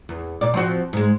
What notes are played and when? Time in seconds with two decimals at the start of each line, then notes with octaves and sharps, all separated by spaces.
0.09 E2
0.41 A#2 D5
0.54 F3 C4 F#4
0.93 G#2 G#3